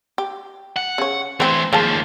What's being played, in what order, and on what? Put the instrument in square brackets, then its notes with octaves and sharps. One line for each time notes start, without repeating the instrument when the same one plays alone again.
[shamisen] G4
[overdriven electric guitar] F#5
[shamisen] C#3 C#5
[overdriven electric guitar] E3 A3 [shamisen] C4 C5
[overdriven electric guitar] D#2 F3 [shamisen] A#3 G#4 A5